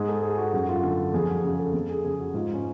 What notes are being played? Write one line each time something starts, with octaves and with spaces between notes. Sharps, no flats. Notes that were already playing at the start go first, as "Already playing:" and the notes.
Already playing: G#2 G#4
A4
G#4
F#4
F#2 F#4
F4
D3 A4
F2 G#4
F#4
C#3 G#4
A4
F2
G#4
C#3 G#4
F#4
G#2 F4
C#4